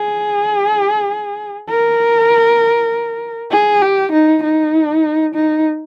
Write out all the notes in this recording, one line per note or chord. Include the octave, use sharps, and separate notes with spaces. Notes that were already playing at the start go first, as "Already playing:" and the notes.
Already playing: G#4
A#4
G#4
G4
D#4
D#4
D#4